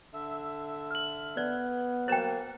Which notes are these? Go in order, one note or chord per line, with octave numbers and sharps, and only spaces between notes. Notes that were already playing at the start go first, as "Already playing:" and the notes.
D3 E5
F6 F#7
B3 D5 F#6
F#3 A#3 C5 G5 A6 E7